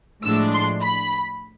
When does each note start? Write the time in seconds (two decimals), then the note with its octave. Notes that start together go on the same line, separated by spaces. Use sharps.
0.24 A2 F3 G#3 D4 E6
0.53 C6
0.82 B5